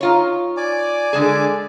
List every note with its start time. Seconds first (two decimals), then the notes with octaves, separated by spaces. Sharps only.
0.01 D#4 F4 C#5
0.57 D5 G#5 D6
1.13 D3 G#3 G#4